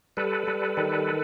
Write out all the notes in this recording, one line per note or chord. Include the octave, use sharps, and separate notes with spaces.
G3 A4 B4
G3
D#3